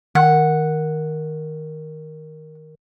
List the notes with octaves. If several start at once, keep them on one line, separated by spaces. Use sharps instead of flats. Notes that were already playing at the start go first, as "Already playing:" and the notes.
D#3 F#5